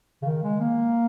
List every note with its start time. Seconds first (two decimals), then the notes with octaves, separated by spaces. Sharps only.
0.22 C#3
0.25 D#3
0.43 G#3
0.60 A#3